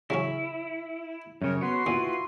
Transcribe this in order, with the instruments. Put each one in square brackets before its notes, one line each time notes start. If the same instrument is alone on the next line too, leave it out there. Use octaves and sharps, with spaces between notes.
[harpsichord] C#3 F#3 C#4 [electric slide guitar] E4
[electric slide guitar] F#2 C#3 [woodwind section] G4 A#4 C#5
[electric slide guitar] B3 B4 C#5 [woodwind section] F#4 C6
[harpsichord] D2 A#2 [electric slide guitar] E4 F4 B4